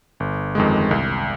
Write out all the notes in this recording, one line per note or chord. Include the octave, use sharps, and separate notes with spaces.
G1
F2 D#3 G#3
C2